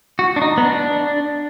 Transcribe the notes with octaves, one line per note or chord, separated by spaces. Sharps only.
F#4
D4
D#4
B3
D4